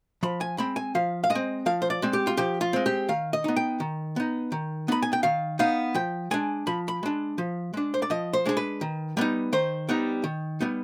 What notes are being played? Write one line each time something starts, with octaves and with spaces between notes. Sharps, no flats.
F3 B5
G#5
G#3 C4 B5
G#5
F3 F5
F5
G#3 D#5
C4
F3 F5
C5
D5
G#3 C4
G4
F4
F3 G4
F4
G#3 C4
G4
D#3 F5
D#5
B3 D#4
G5
D#3
B3 D#4
D#3
B3 D#4 B5
G#5
G5
D#3 F5
B3 D#4 F5
F3 G5
G#3 D4 G#5
F3 B5
B5
G#3 D4
F3
G#3 D4
C5
D5
F3 D#5
C5
G#3 D4 G#4
B4
D#3
G3 B3 D#4
D#3 C5
G3 B3 D#4
D#3
G3 B3 D#4